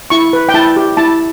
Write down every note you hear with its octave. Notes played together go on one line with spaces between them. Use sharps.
E4 C#6
B4
G5
E4 A5
G4
E4 A5